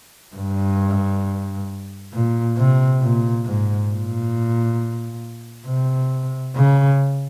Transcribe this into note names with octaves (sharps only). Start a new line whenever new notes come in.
G2
A#2
C3
A#2
G#2
A#2
C3
C#3